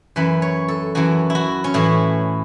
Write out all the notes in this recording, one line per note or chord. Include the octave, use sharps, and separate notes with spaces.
F#2 E3 B4
C#5
A4
F#2 E3 F#4
E4
F#4
C#4
A2 E3 E4